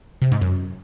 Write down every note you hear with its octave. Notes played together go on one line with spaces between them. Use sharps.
C3
G#2
F#2